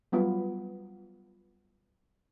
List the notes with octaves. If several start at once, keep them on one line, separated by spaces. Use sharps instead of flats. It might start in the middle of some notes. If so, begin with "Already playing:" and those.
F#3 G3 B3 F4